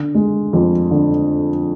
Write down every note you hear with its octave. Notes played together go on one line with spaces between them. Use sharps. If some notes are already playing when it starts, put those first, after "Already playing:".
Already playing: D3
G#3
F2
D3